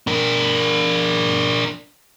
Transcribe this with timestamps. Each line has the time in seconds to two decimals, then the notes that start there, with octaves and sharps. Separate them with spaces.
0.07 D4 A#4